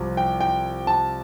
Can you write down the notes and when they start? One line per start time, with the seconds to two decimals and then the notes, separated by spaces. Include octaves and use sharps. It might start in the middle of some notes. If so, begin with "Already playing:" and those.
Already playing: C2 C3 F3
0.17 G5
0.41 G5
0.87 A5